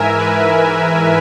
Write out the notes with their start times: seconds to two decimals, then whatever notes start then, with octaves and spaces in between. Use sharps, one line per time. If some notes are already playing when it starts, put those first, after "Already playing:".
Already playing: G#2 E3 A#4 E5 G#5
0.17 B4